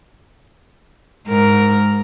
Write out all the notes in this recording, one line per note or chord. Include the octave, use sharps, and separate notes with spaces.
G#2 A#4